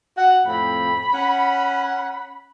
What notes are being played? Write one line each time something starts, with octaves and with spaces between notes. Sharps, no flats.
F#4 F#5
F2 A2 C4 B5
C#4 F#5